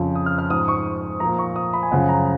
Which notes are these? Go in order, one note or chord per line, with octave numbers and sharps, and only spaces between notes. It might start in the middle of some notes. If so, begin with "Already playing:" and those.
Already playing: F2 C#3 F3
D#6
F6
F6
G#2 F3 D#6
C#6
A#2 F3 A#5
C#6
D#6
B5
G#5
F#2 C#3 F3 F#5
A#5